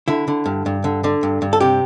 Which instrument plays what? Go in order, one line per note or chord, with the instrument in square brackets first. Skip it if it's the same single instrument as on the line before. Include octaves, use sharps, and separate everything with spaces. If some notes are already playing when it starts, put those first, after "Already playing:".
[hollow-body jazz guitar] D3 E4
D3
G2
G2
D3
D3
G2
G2
A4
C3 G4